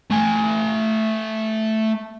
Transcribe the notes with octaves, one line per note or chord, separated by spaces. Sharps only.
A3 G#5